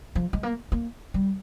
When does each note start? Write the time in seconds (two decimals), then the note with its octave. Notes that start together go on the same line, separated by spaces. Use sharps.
0.15 F3
0.33 G#3
0.43 A#3
0.72 A#3
1.14 G3